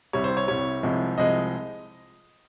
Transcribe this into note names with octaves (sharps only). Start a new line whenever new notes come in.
C2 C3 G3 C#5
C5
C#5
C2 C3 G3 C#5
C2 C3 F3 G#3
C2 C3 F3 G#3 D#5